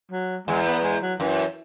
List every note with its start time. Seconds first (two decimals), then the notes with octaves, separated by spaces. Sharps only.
0.11 F#3
0.48 E2 G#3
0.66 B3
0.84 G#3
1.01 F#3
1.20 F#2 E3